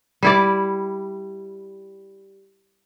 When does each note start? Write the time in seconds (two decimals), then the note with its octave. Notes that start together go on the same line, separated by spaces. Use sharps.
0.23 G3 E4 D5